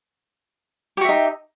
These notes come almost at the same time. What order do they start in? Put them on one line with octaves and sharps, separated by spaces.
G4 F#4 E5 D#4